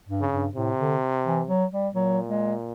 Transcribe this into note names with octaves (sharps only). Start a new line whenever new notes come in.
G2
C#3
G2
A2 C3
D3
E3
F#3
G3
A#2 F#3
G#3